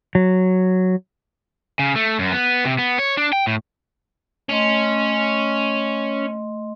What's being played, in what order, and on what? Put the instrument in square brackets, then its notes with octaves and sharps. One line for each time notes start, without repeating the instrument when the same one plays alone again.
[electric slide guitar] F#3
[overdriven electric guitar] C#3
A3
F#2
B3
C3
B3
C#5
D4
G5
A2
[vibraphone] A3 D#5 C6 [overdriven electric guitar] C#4